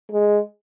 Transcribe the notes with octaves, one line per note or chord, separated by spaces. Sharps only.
G#3